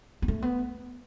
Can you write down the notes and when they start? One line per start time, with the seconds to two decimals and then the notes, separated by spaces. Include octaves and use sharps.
0.22 B3
0.28 A3
0.42 B3